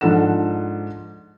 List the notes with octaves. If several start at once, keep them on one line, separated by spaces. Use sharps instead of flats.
G#2 F3 D4 A4 F#5 E7